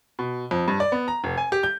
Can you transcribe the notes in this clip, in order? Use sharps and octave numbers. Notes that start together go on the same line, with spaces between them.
B2
F2
G2
D5
B3
A#5
F1
G#5
G4
G6